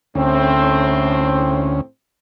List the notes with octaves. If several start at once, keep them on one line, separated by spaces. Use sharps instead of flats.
D2 A2 C4 C#4